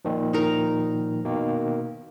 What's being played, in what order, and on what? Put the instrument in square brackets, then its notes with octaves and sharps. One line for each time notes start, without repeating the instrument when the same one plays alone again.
[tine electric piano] A#2 D#3 F3
[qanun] D#4 A#4
[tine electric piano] B2 D#3 A#3